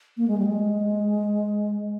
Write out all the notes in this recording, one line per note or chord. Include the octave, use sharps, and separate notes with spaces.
A#3
G#3
G3
G#3